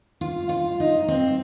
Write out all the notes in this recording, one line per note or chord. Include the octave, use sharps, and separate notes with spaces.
F4
F4
D#4
C4